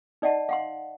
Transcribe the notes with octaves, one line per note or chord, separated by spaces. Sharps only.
D#4 D5 D#5 F#5 A5
F5 F#5 C6